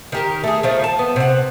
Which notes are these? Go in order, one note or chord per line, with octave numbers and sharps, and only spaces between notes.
D#3 G4 A#4
A3 G#4
D#3 F3 A3
A5
B3
C3 F#5